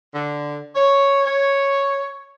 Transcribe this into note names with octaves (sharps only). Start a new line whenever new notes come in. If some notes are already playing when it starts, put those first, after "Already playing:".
D3
C#5
C#5